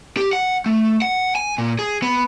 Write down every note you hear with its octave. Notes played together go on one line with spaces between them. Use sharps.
G4
F#5
A3
F#5
G#5
A#2
G#4
B3